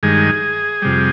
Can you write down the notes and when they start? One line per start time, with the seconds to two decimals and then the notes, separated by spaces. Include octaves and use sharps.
0.03 G2 D#3 G#3 G#4
0.82 F2 C3 G3